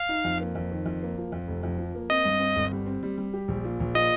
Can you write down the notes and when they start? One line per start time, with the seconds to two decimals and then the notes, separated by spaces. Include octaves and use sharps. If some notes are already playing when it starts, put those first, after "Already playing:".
Already playing: F5
0.09 D#4
0.25 F2
0.40 A#3
0.55 F2
0.71 D#3
0.86 F2
1.02 A#3
1.18 F3
1.32 F2
1.48 F1
1.63 F2
1.78 F3
1.95 A#3
2.10 C4 D#5
2.25 G2
2.40 C4
2.56 G1
2.72 G3
2.86 C4
3.03 G3
3.18 G3
3.33 G4
3.48 A#1
3.64 A#2
3.80 A#1
3.94 A#2 D#5